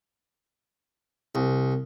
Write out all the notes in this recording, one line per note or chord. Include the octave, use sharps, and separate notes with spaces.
C2